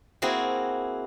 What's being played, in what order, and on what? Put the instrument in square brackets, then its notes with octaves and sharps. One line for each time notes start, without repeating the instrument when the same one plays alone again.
[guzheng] A#3 C4 E4 F#4 G#4